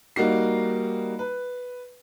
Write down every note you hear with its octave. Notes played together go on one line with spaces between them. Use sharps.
G3 A#3 D#4 F#4 C7
B4